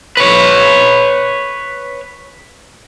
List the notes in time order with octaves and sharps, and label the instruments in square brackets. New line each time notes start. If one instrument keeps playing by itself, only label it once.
[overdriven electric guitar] B4 C#5